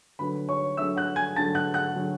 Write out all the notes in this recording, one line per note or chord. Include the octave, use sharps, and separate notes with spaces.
D2 D3 F#3 B4 B5
C#5 C#6
D2 D3 F#3 E5 E6
F#5 F#6
G#5 G#6
D2 D3 F#3 A5 A6
F#5 F#6
F#5 F#6
D3 F#3